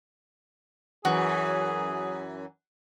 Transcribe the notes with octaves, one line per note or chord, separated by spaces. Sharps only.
F#2 E3 F#4 G#4